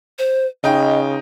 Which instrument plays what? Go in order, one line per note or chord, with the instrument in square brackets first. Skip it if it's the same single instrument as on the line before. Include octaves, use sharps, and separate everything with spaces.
[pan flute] C5
[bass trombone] C#3 [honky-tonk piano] D#4 G5 [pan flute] D#5